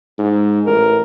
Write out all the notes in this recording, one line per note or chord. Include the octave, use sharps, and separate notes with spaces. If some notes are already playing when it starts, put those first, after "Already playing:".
G#2
A1 A#4